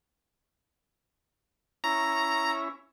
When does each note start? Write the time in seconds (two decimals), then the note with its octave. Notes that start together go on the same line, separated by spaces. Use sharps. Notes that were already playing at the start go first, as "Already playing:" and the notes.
1.84 C#4 E4 A#5